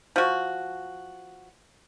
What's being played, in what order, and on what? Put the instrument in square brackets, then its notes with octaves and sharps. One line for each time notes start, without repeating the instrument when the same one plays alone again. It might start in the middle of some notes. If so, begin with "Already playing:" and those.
[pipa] F3 F#4